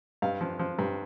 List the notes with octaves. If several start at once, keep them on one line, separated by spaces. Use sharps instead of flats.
G2 F5
F3
F3
G2